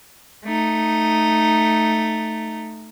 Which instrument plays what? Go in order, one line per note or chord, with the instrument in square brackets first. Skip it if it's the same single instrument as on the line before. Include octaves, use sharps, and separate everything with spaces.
[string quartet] A3 D#4